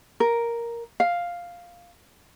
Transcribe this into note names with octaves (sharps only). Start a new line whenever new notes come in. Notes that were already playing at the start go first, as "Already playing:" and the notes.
A#4
F5